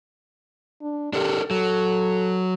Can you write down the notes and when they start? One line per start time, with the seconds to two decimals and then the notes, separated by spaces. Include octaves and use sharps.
0.82 D4
1.13 D4 G4 A4 A#4
1.51 F#3 A4